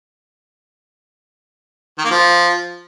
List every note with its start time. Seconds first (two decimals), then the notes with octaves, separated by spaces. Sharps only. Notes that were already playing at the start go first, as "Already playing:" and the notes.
1.98 D#3
2.04 A#3
2.11 F3